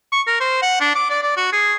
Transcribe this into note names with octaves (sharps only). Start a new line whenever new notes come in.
C#6
A#4
C5
F#5
D4
D6
D5
D5
F#4
G#4